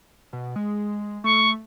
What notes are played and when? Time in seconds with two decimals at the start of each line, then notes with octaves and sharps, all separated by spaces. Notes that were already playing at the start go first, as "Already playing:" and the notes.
0.33 B2
0.56 G#3
1.24 A3 C#6